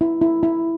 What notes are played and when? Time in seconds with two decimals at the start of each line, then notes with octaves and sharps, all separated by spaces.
0.01 E4
0.21 E4
0.43 E4